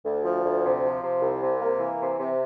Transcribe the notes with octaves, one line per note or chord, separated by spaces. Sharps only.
D2
F3
D2
C3
F3
C3
C2
C3
A#3
E3
C3
C3